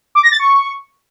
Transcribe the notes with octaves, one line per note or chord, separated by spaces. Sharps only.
D6
A#6
A6
C#6